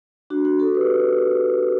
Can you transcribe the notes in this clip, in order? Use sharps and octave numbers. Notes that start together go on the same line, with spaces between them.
D4 F#4
D4 F#4
F#4 A4
G4 B4